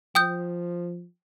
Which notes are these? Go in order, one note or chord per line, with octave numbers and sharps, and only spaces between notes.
F3 G5 D#6 G6